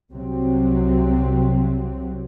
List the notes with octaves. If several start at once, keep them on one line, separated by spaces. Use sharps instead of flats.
C2 C3 F#3 C4